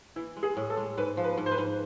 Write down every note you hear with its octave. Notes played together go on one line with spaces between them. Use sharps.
E3 E4
G#3
G#4
A2
A4
G#3
G#2 B4
F3
B4
G#2
C5
B4
G#2